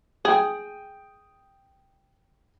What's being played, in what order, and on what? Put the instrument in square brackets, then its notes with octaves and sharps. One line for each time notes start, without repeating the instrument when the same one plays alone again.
[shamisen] G#4 [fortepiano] G5 D#6